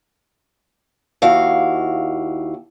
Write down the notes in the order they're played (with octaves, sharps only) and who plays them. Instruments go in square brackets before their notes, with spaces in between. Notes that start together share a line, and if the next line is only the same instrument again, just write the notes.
[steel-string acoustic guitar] D#2 E4 F#4 F5